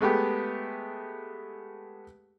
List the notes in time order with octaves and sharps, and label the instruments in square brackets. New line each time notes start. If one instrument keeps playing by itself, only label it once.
[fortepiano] G#3 A3 B3 G4